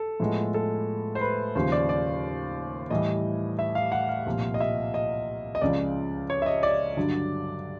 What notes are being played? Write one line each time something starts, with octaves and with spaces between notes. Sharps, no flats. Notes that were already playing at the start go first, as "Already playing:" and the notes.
Already playing: A4
A2 F3 G#3 B3
A4
C5
B4
D#2 C#3 F3 C5
D5
D5
A2 E3 G3 D#5
E5
F5
F#5
F5
C2 A#2 F3
D#5
E5
D#5
D#5
C#2 C#3 F3 D5
C#5
E5
D#5
D5
G2 D3 F#3